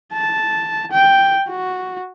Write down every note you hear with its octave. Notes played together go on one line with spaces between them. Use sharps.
A5
G5
F#4